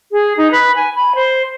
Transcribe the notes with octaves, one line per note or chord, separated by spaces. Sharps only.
G#4
D#4
B4
G#5
B5
C5